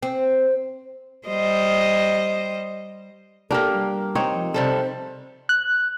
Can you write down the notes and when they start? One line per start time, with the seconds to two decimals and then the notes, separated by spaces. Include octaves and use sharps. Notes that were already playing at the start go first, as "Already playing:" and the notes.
0.03 C4
1.28 G3 C5 D#5
3.51 A#3 D4 G4 A4 A#4
3.73 G3
4.15 C4 D#4 C#5
4.33 F3
4.54 C3 G3 A4 C5
5.49 F#6